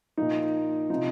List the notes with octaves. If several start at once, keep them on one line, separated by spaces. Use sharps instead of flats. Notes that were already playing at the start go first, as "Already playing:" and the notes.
A#2 F3 D#4
C3 F3 D#4